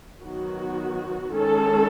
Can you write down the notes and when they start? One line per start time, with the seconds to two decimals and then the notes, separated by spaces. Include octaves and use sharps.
0.21 D#3 F#3 B3 F#4
1.32 D#3 G#3 C#4 A4